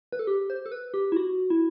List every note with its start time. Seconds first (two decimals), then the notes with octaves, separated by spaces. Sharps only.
0.12 B4
0.19 A4
0.27 G4
0.50 C5
0.66 A4
0.72 B4
0.94 G4
1.12 E4
1.16 F#4
1.50 E4